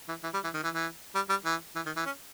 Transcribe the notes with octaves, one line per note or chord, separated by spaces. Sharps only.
E3
E3
G3
E3
D#3
E3
E3
G3
G3
E3
E3
D#3
E3
C#4